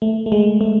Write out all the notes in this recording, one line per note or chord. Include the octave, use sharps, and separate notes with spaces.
A3
A3
G#3
A3